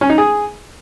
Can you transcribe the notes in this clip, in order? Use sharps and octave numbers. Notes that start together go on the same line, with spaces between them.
C#4
D#4
G#4